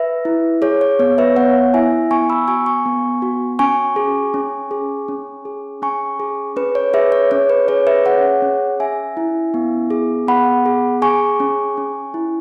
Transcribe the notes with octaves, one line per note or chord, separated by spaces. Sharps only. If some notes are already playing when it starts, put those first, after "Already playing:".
Already playing: B4 E5
E4
G#4 C#5
C#5
B3 C#5
B4 E5
B3 C#5 F#5
E4 E5 G#5
B3 G#5 C#6
B5 E6
F#4 G#5 C#6
G#5 C#6
B3
F#4
C#4 G#5 C#6
G#4
C#4
G#4
C#4
G#4
C#4 G#5 C#6
G#4
C#4 B4
C#5
G#4 B4 E5
C#5
C#4 C#5
B4
G#4 C#5
B4 E5
G#4 C#5 F#5
C#4
C#4 E5 G#5
E4
B3
G#4
B3 F#5 B5
G#4
G#4 G#5 C#6
C#4
C#4
E4